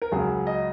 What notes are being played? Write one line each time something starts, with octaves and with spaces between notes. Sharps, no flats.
A#4
C#2 C#3 F#3 G#4
D#5